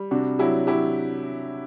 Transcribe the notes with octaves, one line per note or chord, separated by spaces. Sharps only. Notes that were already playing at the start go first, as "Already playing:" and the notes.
Already playing: G3
C3 D4 F#4
F#3 E4 G4
F#3 E4 G4